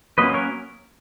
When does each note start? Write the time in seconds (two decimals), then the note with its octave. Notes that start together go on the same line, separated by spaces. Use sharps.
0.18 F#3 A#3 C#4 B4 D#5
0.34 A#4 C#5